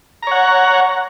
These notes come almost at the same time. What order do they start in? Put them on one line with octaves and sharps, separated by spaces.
A#5 C#5 F#5